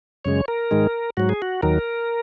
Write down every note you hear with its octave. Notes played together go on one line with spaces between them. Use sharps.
F#2 C#3 G#3 C#5
A#4
G#2 D#3 G#3
G#2 F#3 F#4
G#4
F#4
D#2 D#3 F#3 A#4